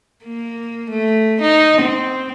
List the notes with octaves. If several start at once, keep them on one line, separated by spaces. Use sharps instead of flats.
A#3
A3
D#4
C4